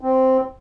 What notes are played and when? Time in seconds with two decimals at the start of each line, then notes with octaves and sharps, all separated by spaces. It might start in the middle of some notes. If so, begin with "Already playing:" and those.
0.01 C4